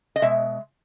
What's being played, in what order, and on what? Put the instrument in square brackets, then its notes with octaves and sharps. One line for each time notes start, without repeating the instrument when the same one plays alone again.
[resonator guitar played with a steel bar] D#5
B2 G#3 E5